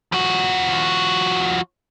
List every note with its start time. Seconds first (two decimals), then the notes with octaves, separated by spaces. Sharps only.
0.12 F3 F#4